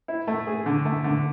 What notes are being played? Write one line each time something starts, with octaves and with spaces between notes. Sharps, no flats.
E4
A3
G#4
D3
A3
D3